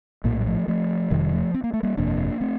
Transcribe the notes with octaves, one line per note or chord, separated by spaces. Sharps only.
A#1 A2 A#3
A3
G3
F3 A3
F3 A3
F1 F2 C3 D#3 G3
F3 A3
C4
A#3
A3
G3 A#3
G1 F2 C3 A#3 D4
A3 C4